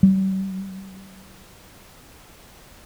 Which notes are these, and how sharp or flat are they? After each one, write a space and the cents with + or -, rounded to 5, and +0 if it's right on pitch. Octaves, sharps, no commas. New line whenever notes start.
G3 -40